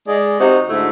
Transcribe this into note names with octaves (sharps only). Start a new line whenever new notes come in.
G#3 D5
C3 D#4 F#4 C5
D2 G#2 A3 E4